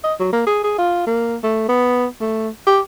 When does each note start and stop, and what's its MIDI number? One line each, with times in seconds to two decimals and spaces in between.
0.04 0.14 75
0.19 0.28 54
0.33 0.43 58
0.47 0.63 68
0.64 0.76 68
0.78 1.02 65
1.06 1.36 58
1.43 1.66 57
1.69 2.06 59
2.20 2.49 57
2.67 2.80 67